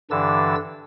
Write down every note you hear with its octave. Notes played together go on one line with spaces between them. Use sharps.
G2 D3 E3 D4 E6 A6